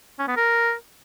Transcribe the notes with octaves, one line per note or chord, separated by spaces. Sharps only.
C#4
B3
A#4